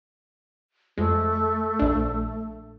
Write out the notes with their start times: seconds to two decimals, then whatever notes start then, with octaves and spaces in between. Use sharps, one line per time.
0.98 F2 G#3 A3
1.79 A#1 D4